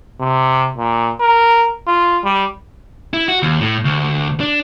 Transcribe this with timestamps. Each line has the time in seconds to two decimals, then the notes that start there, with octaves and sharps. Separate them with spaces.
0.20 C3
0.77 A#2
1.20 A#4
1.87 F4
2.24 G3
3.13 E4
3.28 F#4
3.43 D#2
3.61 A2
3.85 D2
4.40 D4